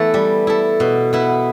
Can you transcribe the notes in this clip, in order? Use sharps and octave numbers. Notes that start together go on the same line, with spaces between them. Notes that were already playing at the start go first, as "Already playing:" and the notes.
Already playing: E3 A3 B3 E4 A4
G3
E4 A4
B2
B3 E4